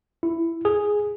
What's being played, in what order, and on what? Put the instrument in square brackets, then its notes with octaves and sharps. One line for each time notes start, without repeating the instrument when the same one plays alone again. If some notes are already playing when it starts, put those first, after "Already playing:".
[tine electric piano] E4
G#4